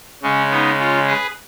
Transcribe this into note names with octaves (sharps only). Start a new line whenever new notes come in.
C#3 G#3 C#4
B3 D#4
C#4 F4
G#4 B4